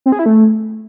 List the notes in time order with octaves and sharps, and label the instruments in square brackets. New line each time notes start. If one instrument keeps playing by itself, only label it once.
[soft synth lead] C4
G#4
E4
A3